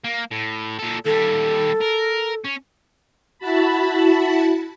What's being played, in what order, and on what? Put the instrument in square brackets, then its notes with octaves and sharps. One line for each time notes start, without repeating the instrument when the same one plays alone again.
[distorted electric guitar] A#3
A2
A#2 A4
[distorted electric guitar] D#2 G3 [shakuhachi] A4
[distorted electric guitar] A#4
C#4
[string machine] E4 F#4 A5 B5